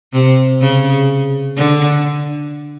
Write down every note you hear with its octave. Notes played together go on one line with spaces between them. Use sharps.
C3
C#3
D3